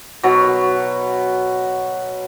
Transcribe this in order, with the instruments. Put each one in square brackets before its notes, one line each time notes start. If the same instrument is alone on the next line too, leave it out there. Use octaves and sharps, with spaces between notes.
[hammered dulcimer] B2 F#3